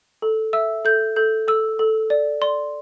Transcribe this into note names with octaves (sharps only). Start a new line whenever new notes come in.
A4
E5 E6
A4 G6
A4 G6
A4 E6
A4
D5
D5 C6